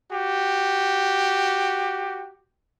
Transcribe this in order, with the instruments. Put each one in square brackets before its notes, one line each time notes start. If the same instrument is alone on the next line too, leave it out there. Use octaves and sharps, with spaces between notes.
[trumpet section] F#4 G4